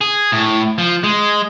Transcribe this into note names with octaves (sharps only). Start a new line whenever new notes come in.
G#4
A2
F3
G#3